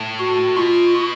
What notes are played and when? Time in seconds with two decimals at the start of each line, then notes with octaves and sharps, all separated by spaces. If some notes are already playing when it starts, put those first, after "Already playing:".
Already playing: A2
0.19 F#4
0.56 B2 F4